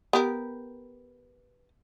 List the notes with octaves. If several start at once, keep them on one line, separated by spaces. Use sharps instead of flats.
B3 G4 A#4